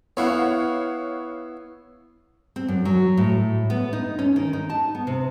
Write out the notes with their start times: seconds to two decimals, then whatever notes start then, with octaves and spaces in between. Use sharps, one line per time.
0.17 B3 E4 C#5 F5 F#5
2.56 C4
2.68 F#2
2.85 F#3
3.17 A2
3.70 B3
3.93 D#4
4.19 C#4
4.36 D#3
4.53 D#4
4.70 A5
4.95 B3
5.07 C3